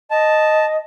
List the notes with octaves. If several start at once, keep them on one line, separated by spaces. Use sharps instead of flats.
D#5 A5